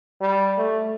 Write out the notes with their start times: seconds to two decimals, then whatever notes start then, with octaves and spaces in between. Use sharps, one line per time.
0.21 G3
0.58 A3